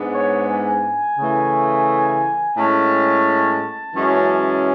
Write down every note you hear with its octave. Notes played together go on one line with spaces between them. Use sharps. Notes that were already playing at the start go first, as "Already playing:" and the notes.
Already playing: G#2 G#3 B3 D4
C#5
G#5
C#3 E3 A3
A2 G#3 C#4 A5
F#2 E3 G#3 C#4